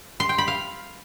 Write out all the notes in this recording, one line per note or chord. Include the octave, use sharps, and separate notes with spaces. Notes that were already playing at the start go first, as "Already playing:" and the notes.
C6
G5
B5
F5